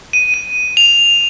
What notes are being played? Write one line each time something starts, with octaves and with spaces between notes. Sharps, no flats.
D#7
D#7
F7